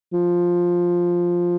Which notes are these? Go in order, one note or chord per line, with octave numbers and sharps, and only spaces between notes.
F3